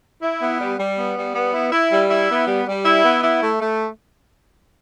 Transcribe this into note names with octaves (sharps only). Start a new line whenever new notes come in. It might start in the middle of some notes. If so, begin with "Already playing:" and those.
E4
B3
G3
G3
B3
G3
B3
E4
E4
G3
E4
B3
G3
G3
E4
B3
E4
A3
A3